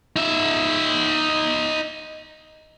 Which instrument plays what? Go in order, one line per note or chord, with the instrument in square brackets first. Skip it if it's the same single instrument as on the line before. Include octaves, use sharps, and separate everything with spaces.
[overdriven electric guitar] D#4 E5